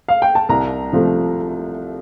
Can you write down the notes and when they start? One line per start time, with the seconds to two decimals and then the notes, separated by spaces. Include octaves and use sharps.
0.08 F5
0.22 G5
0.35 A5
0.49 C2 A#5
0.93 C3 F3 A3